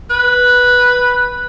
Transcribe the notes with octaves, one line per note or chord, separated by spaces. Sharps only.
B4